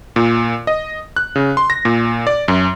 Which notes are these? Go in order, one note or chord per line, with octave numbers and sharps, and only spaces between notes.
A#2
D#5
F#6
C#3
C6
A#6
A#2
D5
F#2